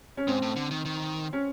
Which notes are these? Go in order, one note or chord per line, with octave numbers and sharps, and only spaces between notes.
C#4
G#2 C4
A2
D3
D#3
D#3
C#4